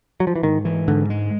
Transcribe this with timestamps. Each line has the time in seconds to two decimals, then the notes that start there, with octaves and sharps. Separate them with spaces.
0.20 F#3
0.27 F3
0.36 E3
0.43 G#2 D#3
0.65 E3
0.87 G#2 D3
1.10 G#3